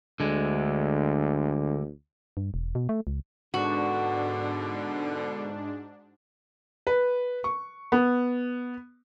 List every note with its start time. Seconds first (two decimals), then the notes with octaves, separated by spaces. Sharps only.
0.20 D2 D3 G#3
2.37 G2
2.54 E1
2.75 B2
2.89 A3
3.07 C#2
3.54 G#2 B2 D3 D4 F#4
6.87 B4
7.44 C#6
7.92 B3